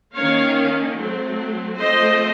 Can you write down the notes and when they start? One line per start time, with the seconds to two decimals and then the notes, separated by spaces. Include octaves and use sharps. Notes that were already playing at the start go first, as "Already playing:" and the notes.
0.15 D#3 A#3 C#4 C#5 F5
0.97 F#3 A3 C4
1.78 F3 A3 C4 C5 D#5